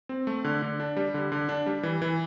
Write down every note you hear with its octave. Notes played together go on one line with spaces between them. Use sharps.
C4
A3
D3
D3
D4
G3
D3
D3
D4
G3
E3
E3